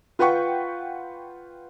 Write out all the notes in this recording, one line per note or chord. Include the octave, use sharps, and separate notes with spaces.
F4 B4 F#5 G5 C#6